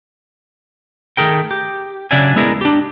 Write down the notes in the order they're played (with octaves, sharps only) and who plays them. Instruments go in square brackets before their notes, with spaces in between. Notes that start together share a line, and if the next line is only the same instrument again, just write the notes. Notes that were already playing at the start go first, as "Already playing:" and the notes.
[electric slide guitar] D#3 A3 G#4 A#4 G5
G4
C#3 F#3 D4 D5 E5 G#5
G#3 B3 E4 G#4 A#4 D5
D4 G4